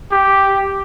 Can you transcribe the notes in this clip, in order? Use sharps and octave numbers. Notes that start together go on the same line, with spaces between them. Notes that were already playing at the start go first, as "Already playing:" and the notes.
G4